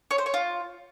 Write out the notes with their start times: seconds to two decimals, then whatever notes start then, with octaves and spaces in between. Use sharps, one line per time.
0.11 C#5
0.18 C5
0.26 C#5
0.34 F4